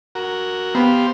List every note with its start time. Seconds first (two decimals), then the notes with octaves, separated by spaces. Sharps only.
0.15 F#4 A#4
0.75 B3 G4 C5 F5